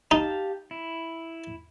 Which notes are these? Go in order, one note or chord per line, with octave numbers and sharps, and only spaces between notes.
D#4 G4 F5 A5
E4